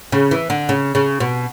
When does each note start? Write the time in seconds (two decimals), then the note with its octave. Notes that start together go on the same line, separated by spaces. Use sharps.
0.12 C#3
0.31 E3
0.50 D3
0.69 C#3
0.95 C#3
1.20 B2